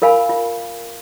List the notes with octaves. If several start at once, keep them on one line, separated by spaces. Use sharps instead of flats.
F4 A#4 F5 G#5 B5
F4